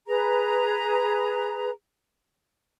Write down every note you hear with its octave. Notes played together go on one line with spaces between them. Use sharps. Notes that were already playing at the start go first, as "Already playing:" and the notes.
G#4 B4 A#5